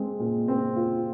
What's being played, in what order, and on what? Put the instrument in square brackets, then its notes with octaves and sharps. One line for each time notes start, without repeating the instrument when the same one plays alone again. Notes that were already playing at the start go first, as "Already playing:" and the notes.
Already playing: [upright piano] G#3 C4
A#2
C4
F4